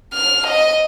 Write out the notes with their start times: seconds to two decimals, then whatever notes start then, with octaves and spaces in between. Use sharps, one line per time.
0.13 F6
0.47 D#5